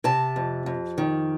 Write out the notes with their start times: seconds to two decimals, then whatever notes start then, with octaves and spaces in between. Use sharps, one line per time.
0.04 C3 A5
0.36 F2
0.66 F2
0.98 D#3